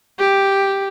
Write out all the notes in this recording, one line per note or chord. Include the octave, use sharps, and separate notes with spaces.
G4